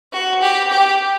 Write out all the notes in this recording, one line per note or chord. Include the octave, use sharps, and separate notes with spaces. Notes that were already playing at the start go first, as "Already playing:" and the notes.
F#4
G4
G4